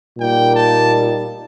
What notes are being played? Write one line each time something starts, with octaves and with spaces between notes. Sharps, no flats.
A#2 G3 A#3 D#4 G5
A5